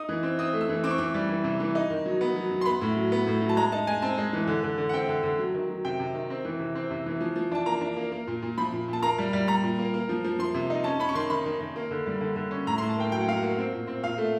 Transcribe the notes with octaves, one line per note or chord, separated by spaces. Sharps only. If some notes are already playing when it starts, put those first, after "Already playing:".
Already playing: D#4 D#6
E3
C4
C4 D#6
A3
E6
E3
C4 D6
C#6
E3 D6
G3
E3
C3
E3
D#4
D#3
F#3
B3
F#3
F#3
C6
B3 B5
A2
F#3
B3
A2
F#3
A5
G#3 A#5
D#4 A5
G#3 G#5
C4 A5
G#3
E3
D3
D3
D3
F#5
C4 G5
D3
D3
F#3
D#3
F#3
C3 G5
C3
D#3
C4
E3
C3
C4
C3
E3
F3
F3
D4 A5
A#3 A#5
D4
A#3
A#3
A#2
A#2
F3 B5
A#2
A#2 A5
A#3 A#5
G3
G3
G3 A#5
A#2
A#3
A#3
F3
F3
F3 C6
C3
D#4
C#4 A5
C#4 B5
C#6
D#3 C6
D#3 B5
D#3
D#3
A#3
D3
G3
D3
D3
C#4
A2 A#5
C6
A2
A5
A#3 G5
F#3 G5
F#5
F#3 F5
F#5
A#3
C4
A#2
C4
A#2 F5
A3